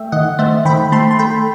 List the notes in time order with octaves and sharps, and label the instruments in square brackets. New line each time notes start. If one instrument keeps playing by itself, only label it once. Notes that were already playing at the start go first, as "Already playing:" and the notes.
Already playing: [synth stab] A3 E5 G5
D#3 D#5 F#5
A3 C5 E5
D#3 G5 B5
A3 A5 C6
C6
A3 G5 B5